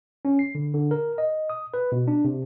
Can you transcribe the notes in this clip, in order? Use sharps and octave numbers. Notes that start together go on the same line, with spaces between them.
C#4
C7
D3
D3
A#4
D#5
D#6
B4
B2
D4
C3